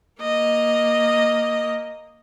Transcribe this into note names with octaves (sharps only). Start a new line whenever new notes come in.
A#3 D#5